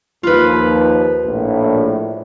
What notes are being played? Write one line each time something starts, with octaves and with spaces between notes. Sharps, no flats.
D#2 F3 F4 B4
A#1 A2